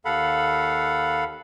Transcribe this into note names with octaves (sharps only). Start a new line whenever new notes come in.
D#2 A4 F5 F#5 B5